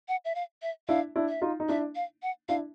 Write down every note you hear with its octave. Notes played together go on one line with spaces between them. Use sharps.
F#5
E5
F5
E5
D4 E4 F5
D4 E4
E5
D#4 F4
D#4
D4 E4 E5
F5
F#5
D4 E4 F5